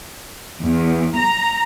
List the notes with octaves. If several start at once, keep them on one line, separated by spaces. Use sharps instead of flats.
E2
A#5